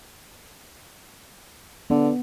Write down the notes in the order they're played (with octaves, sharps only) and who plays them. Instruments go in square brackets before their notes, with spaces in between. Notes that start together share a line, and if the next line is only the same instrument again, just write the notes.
[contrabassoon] D3 [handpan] B3